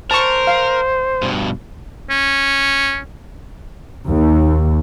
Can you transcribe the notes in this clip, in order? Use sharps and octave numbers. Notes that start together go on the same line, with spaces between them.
A#4 C5 A5 C#6
F5
G2 B2
C#4
D#2